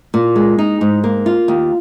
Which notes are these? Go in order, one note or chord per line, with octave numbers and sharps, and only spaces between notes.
A#2
G#3
D#4
G#2
A#3
F4
D#2